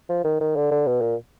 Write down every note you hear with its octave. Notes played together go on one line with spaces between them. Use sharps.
F3
D#3
D#3
D3
D3
B2
A#2